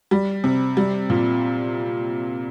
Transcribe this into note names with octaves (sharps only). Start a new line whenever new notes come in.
G3
C3
G3
A#2